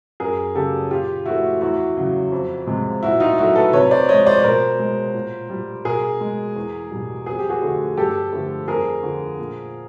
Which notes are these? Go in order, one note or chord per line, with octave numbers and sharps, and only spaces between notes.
F#2 G#4 A#4
C#3 F#3 G4 A4
A#2 F4 G4
F3 A3 E4 F#4
E2 E4 F#4
C#3 F#3
F2
C3 F3 G#3
A#2 E4 F#4
D#4 F4
F#3 A3 E4 F#4
A4 B4
C3 B4 C#5
C5 D5
F3 G#3 C#5 D#5
C5 D5
B2 A#4 C5
G#3
A#2
G3
B2 G#4 A#4
G#3
E2
B2 G3
F2 G#4
G4
F#4 G#4
D3 F3 A3
G2 G4 A4
D3 F3 A3
F2 G#4 A#4
D3 F3
A#2